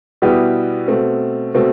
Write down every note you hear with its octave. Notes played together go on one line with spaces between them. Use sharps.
B2 G3 B3 E4 G4
B2 A3 C4
B2 A3 C4